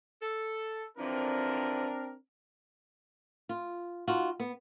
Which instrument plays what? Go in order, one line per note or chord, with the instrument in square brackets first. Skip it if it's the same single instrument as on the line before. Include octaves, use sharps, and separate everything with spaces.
[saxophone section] A4
[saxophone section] D3 E3 F3 [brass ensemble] C4 D4 A#4
[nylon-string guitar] F4
D#4 F4 F#4
B3